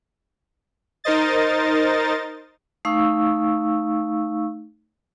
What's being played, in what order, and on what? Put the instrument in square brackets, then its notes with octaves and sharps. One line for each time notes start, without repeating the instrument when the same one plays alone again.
[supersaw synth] D#4 A#4 C5 D#5 A6
[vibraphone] A3 D#4 F5 C#6 E6